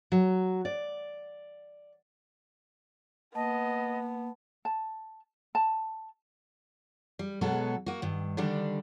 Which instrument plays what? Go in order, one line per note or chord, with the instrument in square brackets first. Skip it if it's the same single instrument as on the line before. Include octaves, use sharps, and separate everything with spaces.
[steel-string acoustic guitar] F#3
D5
[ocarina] A#3 [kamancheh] B3 [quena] D#5 [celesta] A5
[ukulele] A5
A5
[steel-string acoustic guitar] G3
B2 F#3 G#3 B3 A4
A#3 F#4
G2 D#3
D3 D#3 G3 D4